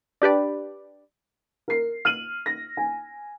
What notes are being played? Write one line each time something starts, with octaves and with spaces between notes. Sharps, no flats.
D4 G4 B4 D5
A#4 C7
F6 D#7 F#7
A#6
G#5